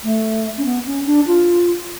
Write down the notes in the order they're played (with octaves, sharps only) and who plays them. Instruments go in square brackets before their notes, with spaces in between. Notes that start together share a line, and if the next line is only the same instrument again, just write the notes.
[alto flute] A3
C#4
B3
C#4
D4
F4